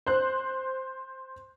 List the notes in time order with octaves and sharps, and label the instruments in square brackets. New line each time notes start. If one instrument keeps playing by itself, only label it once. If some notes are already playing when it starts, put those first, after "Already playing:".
[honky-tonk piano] C5 F#6